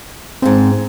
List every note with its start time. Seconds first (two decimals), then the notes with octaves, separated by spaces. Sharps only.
0.42 E2 G#2 C4